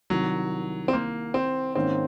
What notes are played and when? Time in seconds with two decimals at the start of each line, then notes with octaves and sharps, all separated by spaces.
0.10 C2 C3 D#3 F#3
0.88 C4
0.93 A#3
1.34 C4
1.75 G#2 D#3 A#3 C4 C#4